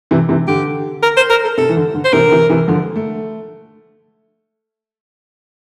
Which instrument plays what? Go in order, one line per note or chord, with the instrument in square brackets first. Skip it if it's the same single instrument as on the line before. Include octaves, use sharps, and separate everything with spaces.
[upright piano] C3 E3
C3 E3
[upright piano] D3 [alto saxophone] G4
[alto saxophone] A#4
C5
A#4
A4
[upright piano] C3 [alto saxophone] A4
[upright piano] E3
D3
D3
[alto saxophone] C5
[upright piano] C3 E3 [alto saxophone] A#4
[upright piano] D3
C3 E3
C3 E3
D3 F3
A3